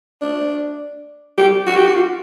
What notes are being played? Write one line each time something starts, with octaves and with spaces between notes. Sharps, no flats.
D4
G4
F#4
G4
F#4
F4